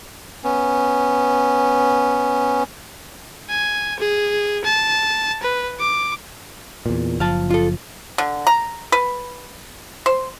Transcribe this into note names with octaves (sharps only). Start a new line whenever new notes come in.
B3 C#4
G#5
G#4
A5
B4
D6
E2 A#2
F#1 F3 F5 A5
F4 A4
D3
A#5
B4
C5